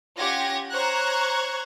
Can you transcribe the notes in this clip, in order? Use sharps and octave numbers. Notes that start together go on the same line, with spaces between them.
C#4 F4 G4 F#5 G#6 A#6
C5 C#5 A#5 C#6 F#6 G#6